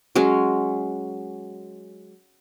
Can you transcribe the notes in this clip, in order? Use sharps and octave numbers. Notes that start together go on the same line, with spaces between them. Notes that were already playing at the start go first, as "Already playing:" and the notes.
F#3 G#3 C#4